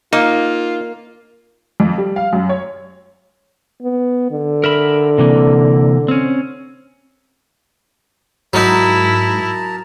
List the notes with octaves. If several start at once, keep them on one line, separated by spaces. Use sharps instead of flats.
A#3 D#4 F4
F2
G3
F5
F#2
C#5
B3
D3
A#4 E5 B5
C3 E3 A#3
C4 C#4
G#2 F#3 D#4 E4 A#4 A5 A#5